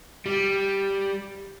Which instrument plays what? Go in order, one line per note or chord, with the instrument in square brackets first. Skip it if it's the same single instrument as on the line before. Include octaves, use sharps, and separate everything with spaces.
[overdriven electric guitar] G3